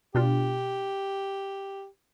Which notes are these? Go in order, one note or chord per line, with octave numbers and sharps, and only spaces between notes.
B2 D4 F4 G4